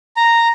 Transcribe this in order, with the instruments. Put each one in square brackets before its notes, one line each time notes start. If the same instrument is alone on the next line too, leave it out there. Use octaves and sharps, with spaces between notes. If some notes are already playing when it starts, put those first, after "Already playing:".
[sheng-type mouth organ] A#5